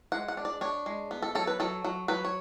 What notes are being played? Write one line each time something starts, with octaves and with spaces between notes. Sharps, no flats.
G#3 F#5
F#5
D4
D5
D4 C#5
G#3
B3
A4
F#3 A4
B4
F#3 A4
F#3
F#3 B4
C#5